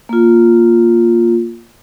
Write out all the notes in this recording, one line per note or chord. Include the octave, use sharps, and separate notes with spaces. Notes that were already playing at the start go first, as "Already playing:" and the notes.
A#3 F4